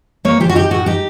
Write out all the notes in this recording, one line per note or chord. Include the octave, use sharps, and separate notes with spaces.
A#3 C#5
F3 G4
F#4
D#4 G4
A2 F#4
D#4 G4